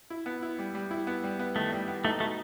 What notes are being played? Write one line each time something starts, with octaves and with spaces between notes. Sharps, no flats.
E4
B3
E4
G3
G3
E4
B3
G3
B3
D#3 A3
G3
B3
A3 D#4
B2 A3